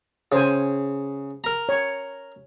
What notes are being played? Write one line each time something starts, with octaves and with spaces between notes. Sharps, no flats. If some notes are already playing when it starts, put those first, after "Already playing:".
C#3 G#4 C5 G#5
A#4 A#5
C#5